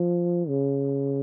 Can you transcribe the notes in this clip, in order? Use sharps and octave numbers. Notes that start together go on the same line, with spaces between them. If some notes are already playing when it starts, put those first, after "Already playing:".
Already playing: F3
C#3